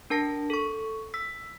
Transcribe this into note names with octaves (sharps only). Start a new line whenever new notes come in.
D4 A#4 A5 A#6
A4 C#6
E6 B6